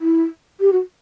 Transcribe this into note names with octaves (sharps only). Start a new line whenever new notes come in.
E4
G4
F#4